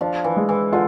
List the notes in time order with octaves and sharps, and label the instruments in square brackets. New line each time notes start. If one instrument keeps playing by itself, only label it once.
[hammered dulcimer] F3 [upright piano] D4
[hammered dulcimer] E3
[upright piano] G#3
[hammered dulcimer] E3
[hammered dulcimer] D3 [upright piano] F4